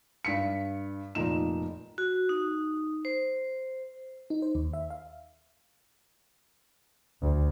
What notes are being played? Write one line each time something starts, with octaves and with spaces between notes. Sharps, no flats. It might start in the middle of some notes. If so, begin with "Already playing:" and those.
G2 B6 C#7
F1 A#2 D#4 E7
F#4
D#4
C5
D#4
C5
D#2
E5
F5
D2